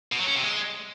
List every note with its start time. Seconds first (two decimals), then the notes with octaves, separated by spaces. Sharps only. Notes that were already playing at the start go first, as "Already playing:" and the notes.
0.12 B2
0.20 F#3
0.27 C#4
0.35 C3
0.43 G#3